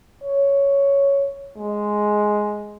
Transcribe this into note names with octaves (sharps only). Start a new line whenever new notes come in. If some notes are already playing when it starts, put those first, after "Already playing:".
C#5
G#3